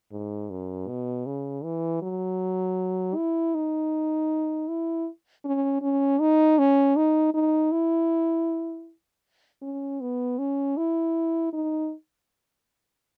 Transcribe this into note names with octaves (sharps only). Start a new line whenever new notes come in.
G#2
F#2
B2
C#3
E3
F#3
E4
D#4
E4
C#4
C#4
D#4
C#4
D#4
D#4
E4
C#4
B3
C#4
E4
D#4